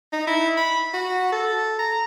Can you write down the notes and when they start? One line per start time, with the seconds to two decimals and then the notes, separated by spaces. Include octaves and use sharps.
0.13 D#4
0.27 E4
0.57 B5
0.94 F#4
1.32 A4
1.79 A#5